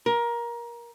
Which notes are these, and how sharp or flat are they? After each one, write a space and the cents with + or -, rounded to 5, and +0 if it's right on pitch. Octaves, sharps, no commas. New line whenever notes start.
A#4 +20